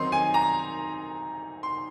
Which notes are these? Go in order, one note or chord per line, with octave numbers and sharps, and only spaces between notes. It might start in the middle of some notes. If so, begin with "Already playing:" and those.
Already playing: D#3 F#3 C4 D#4 C6
G#5
A#5
C6